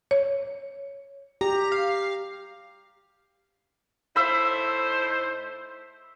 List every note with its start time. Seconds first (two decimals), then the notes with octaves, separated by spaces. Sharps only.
0.11 C#5
1.41 G4 A#5
1.72 F5
4.16 A2 D#4 C5 E5 B5